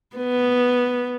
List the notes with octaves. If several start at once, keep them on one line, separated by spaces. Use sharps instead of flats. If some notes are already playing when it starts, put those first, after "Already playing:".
B3